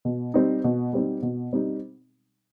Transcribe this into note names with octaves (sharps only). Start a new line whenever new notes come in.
B2
G3 C4 D#4
B2
G3 C4 D#4
B2
G3 C4 D#4